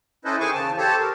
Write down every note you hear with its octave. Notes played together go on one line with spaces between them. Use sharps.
C#4 E4 A4 B4 C5 D#5
D#3 G#4 C5 G#5 C#6 D6
E2 C#3 A5
G4 A4 C5 C#5 A5
A#4